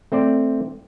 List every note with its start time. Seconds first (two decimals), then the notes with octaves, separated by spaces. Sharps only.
0.12 A3 C4 C5 D5